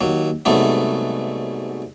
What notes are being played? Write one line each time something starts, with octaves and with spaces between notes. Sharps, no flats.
D#2 F#3
C2 G#2 F#3 A3 B3